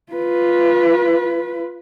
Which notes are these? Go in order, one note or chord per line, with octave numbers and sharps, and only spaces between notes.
F4 B4